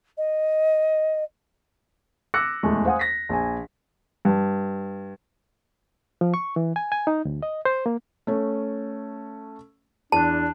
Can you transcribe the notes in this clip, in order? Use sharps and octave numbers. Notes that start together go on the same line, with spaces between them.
D#5
D6 E6 F#6 A#6 C#7
D#1 E2 G#3 A3 C#6
C5 F5 F#5 G#5 D#6
A#6 B6
A#1 G#5
G2
F3
C#6
E3
G#5
G#5
D#4
D2
D#5
C5
A#3
A3 C#4
E2 D4 A5 F#6